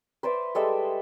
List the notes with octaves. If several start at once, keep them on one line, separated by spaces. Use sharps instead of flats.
B4 C5 D5 E5
G3 G#3 A4 E5